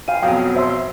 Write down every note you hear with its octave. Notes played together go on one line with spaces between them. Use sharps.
F5 G5 G#5 D#7
F2 B2 F#3 G5 D#6
C5 E5 C6